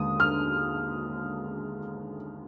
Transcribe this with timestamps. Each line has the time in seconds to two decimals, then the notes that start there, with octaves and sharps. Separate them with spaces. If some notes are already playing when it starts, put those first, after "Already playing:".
Already playing: D#2 D3 G#3 D#6
0.20 F6